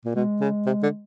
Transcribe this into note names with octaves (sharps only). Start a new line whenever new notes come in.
A#2
B2 G#3
C#3
C3
D3